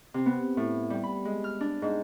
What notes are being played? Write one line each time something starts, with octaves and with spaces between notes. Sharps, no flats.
C3
B3
A2
G3
B5
G#3
F6
D4
G#2